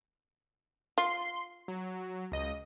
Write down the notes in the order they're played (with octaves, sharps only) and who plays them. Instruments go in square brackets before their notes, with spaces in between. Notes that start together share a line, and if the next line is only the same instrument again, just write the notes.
[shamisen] F4 [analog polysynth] C6 C7
[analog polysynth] F#3
C#2 D#5